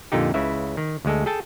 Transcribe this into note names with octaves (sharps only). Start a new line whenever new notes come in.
F2 A#2 D3 D#4 G4
C#2 C#3 E4 B4 E5
D#3
D2 G#3 A4
G#4 A4 G5 A5